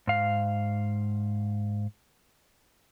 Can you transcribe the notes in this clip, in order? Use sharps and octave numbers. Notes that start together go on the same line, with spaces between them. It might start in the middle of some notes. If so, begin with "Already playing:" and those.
G#2 F5